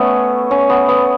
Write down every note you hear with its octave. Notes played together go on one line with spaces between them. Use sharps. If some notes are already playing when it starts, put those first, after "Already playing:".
Already playing: A3 B3 C#4
C#4
B3
B3